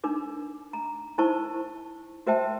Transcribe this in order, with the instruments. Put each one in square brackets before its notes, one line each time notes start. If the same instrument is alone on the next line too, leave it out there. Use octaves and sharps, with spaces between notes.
[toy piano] D4 D#4 A#4 D6
A#5
D#4 E4 A#4 C5 A5 C#6
F#4 A#4 C5 E5 G5 A5